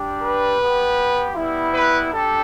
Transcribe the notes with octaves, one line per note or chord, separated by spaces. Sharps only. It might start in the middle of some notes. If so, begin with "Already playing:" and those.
Already playing: G3 D4 G4
B4
B3 G4
G3 B3 E4
B4
G3 D4 G4 A4